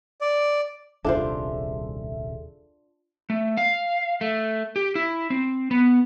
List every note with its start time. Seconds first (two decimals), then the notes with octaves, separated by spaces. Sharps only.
0.21 D5
1.05 D#1 C2 D4 F4 G#4 A4 C5 E5
3.30 A3
3.57 F5
4.21 A3
4.76 G4
4.95 E4
5.30 C4
5.71 B3